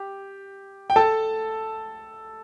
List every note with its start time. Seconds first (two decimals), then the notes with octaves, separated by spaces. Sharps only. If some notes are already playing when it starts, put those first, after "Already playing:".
Already playing: G4
0.90 G5
0.96 A4 A5